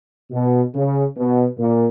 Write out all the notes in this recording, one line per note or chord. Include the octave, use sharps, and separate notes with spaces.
B2
C#3
B2
A#2